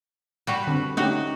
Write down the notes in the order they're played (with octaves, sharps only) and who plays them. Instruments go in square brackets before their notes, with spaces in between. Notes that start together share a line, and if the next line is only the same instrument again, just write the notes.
[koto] G3 F#4 B4
[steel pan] D3 C4
[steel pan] A3 C#4 G4 [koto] D#4 F#4